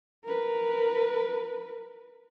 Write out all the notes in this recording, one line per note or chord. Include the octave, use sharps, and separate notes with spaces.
A#4 B4